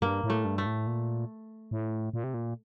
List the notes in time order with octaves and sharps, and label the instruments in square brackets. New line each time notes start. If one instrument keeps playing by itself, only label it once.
[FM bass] G2 [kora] A#3
[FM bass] A2
[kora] A3
[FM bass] G2
[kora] A3
[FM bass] A2
A#2
A2
A#2
C3
A#2